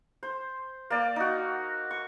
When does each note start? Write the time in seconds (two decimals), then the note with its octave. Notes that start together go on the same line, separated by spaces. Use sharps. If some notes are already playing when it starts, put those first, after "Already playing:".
0.23 C5
0.90 A#3 D5
1.16 D#4 F#4
1.91 C#6